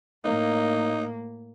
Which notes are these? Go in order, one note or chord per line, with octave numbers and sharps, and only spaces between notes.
A2 A#3 D#4